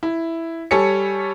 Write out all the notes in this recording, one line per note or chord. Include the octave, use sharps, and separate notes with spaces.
E4
G3 A4 C#5 G#5 C#7